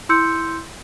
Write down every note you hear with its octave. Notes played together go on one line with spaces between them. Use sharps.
E4 C6 E6 G6 C#7